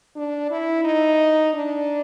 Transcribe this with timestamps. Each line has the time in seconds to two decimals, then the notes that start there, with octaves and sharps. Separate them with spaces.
0.16 D4
0.51 E4
0.84 D#4
1.53 D4